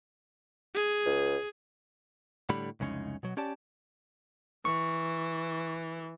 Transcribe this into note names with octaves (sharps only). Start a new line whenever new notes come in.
G#4
C#2
A2 D3 G3 B5
C2 F2 C#3 G#3 C#4 D#4
B2 F#3
C#4 G4 D5 A5
E3 C#6